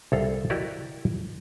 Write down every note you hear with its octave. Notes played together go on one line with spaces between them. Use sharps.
C2 A4 F5
E4 F#4 G4 A#4 D5 D#5